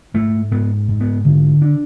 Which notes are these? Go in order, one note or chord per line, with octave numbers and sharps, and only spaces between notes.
G#2 A3
G#2 B3
G#2
B3
D3
D4